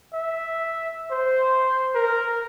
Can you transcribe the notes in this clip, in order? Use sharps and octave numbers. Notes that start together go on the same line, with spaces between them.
E5
C5
A#4